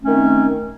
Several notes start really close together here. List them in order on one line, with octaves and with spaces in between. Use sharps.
A3 C#4 D#3 C4